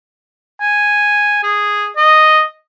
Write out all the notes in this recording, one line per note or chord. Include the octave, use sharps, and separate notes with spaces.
G#5
G#4
D#5